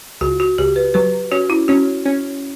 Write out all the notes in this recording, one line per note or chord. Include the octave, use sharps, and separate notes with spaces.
C#2 F#4
F#4
C#2 G4
B4
F#3 B4
C#4 F#4
E4
C#4 F#4
C#4